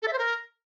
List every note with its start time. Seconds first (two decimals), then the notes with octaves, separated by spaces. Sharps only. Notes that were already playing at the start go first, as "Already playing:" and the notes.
0.02 A4
0.07 E5
0.13 C5
0.18 A#4